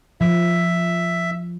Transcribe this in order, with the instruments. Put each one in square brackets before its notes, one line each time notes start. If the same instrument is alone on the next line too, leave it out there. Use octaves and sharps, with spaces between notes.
[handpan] F3 [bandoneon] E5